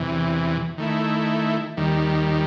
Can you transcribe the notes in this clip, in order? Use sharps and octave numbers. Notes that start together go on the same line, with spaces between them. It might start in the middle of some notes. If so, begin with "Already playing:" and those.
Already playing: E2 C3 E3
D#3 A3 E4
D#2 D#3 G3